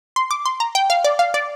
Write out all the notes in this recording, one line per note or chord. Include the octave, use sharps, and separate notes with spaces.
C6
D6
C6
A#5
G5
F5
D5
F5
D5